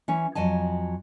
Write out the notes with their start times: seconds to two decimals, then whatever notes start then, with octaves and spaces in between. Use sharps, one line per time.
0.08 E3 C#4
0.35 F2 F#3 D#5 G#5 A5